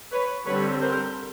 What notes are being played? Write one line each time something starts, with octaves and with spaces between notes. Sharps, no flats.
B4 C#5
D3 G3 C4 B4 C#5
A#4 C5